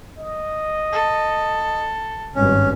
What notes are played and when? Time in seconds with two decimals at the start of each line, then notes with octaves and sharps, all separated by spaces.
0.18 D#5
0.92 A4
2.35 G#1 G2 C#4